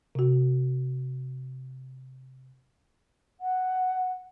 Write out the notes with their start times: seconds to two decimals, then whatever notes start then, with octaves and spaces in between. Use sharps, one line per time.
0.15 C3 F#4
3.40 F#5